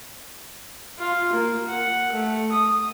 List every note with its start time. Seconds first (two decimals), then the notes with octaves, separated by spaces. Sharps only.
0.99 F4
1.33 A#3
1.68 F#5
2.12 A3
2.51 D#6